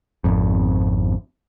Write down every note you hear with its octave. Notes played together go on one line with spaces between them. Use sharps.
G#1 F2